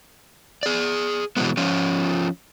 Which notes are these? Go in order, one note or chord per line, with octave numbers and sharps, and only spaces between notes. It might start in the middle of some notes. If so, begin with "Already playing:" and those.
G#4 D5
B2 E3 F#3 G#3 B3
F3 C#4 F4